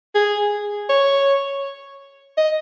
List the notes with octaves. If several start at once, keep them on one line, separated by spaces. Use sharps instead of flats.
G#4
C#5
D#5